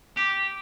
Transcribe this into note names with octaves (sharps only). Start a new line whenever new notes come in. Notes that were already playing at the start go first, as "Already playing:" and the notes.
G4